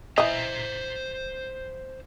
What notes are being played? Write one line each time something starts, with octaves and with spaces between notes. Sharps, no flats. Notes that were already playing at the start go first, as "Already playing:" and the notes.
E3 C5 D#5 A#5